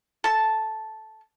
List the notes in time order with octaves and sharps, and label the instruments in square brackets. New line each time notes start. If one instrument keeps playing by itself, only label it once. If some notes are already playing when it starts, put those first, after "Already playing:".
[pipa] A4 A5